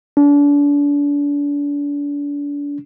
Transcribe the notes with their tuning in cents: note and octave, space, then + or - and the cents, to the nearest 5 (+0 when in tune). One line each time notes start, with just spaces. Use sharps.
D4 -35